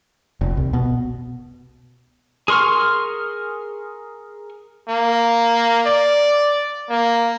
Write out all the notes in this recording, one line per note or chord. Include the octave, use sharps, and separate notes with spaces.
F1
C2
B2
G#4 A#4 C6 C#6 F6
A#3
D5
A#3